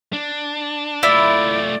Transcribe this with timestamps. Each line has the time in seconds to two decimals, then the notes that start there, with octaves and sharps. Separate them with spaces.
0.13 D4
1.03 A3 E4 F4 D5